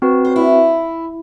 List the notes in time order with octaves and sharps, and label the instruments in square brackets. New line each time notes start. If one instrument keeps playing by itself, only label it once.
[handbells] C4 F#4 B4
[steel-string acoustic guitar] C5
E4